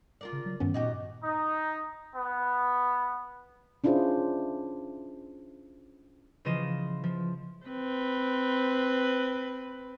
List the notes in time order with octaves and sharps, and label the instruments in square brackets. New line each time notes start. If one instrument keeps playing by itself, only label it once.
[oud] F4 A#4 D5
[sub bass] C#3
F#3
[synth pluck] G2 B3 C#4 [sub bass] D#3
[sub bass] A#2 [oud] D#4 F#4 G4
[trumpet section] D#4
B3
[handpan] C#4 D4 E4 F4 G#4 C5
[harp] C#3 E3 F3 F4 D#5 E7
F3
[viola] C4 B4